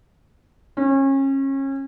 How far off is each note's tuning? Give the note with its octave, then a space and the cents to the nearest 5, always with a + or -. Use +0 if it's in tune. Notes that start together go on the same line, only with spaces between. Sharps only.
C#4 -30